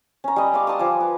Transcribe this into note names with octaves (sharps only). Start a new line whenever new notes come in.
C#4 A#5
G3 D#5
F5 A#5 C6 D6
F#5 A5 C6 D#6
F3 G#5 D6
B4